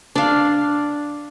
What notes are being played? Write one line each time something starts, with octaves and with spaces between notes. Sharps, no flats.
D4 F5